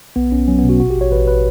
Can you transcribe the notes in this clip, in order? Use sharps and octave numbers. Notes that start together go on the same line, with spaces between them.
B1 B3
B1 C#4
F#3 C#4
B3
B2
F#4
A1 F#4
G4
A1
C#5
A1 B4
B4